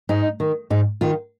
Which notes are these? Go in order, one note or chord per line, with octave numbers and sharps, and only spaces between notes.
G#2 D#4
D#3
G#2 D#4
D#3 F4